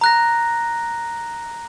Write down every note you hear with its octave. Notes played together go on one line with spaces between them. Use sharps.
A#5 F#6 A#6